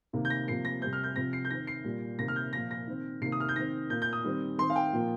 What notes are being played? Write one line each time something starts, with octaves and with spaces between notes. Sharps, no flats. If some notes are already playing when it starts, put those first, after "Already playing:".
C3 D#3 A#3
G6
A#6
C3 F3 A#3 C7
A#6
C3 G3 C4 G6
F6
G6
C3 F3 C4 A#6
C7
G6
D#3 C4 A#6
C7
A#2 G3 A#3
C3 D#3 A#3 A#6
F6
G6
A#2 F3 A#3 A#6
A#6
D#3 C4
C3 D#3 A#3 C7
D#6
F6
G6
D#3 C4 A#6
A#2 A#3 G6
G6
D#6
D#3 G3 C4
D#3 C4 C6
F5
G5
A#2 F3 A#3